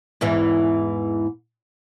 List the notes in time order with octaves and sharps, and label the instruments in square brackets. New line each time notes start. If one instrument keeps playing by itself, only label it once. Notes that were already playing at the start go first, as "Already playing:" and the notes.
[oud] E2 G#2 E3